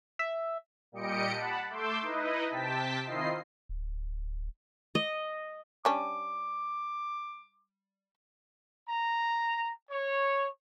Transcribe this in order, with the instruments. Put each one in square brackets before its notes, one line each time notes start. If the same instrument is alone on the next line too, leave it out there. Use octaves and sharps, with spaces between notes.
[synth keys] E5
[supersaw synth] A#2 G3 G4 D#5 C#7 D7
F#5 A5 B5
A3 C6 D6 E6 G6
D#4 E4 B4 D#5
C3 G5 A5 B6
D#3 C4 E4 F4 D#5 C7
[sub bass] D1
[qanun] D#5
[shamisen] G3 C#4 D4 [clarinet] D6
[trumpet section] A#5
C#5